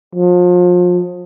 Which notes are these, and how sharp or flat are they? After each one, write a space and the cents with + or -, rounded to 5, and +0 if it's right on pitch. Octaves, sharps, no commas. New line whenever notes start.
F3 +35